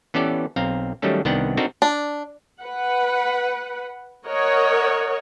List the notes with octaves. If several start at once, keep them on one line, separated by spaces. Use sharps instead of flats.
E3 B3 C#4 G4 A4 D5
B1 C4 F5 A#5
D#3 F#3 G3 A3 C#4 A4
C2 D#3 B3 D4 F#5 G5
C4 D4 D#4 F#4 A4 A#4
D4
B4 F#5
A#4 C#5 D#5 F#5